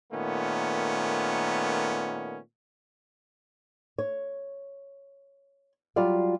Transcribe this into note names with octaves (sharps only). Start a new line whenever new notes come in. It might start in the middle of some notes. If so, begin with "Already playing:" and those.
A#2 D#3 A3 B3 C#4
C#5
F#3 G3 F4 D5 F5